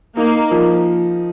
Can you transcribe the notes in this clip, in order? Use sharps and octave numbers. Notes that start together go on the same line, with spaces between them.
A#3 D#4
F3